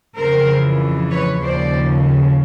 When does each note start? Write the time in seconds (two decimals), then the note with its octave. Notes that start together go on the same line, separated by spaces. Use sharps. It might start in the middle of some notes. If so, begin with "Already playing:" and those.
0.17 F2 C#3 E3 A#4 C5
1.11 B4 C#5
1.43 D#2 C#3 F3 C5 D5